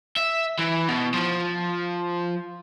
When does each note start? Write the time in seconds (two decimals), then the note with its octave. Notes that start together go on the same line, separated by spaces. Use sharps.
0.17 E5
0.59 E3
0.89 B2
1.14 F3